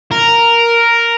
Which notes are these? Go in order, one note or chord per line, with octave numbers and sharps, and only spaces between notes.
A#4